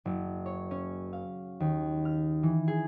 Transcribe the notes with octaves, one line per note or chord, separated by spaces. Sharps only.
F#1
C#5
C#4
F5
D#2
F6
E3
G#4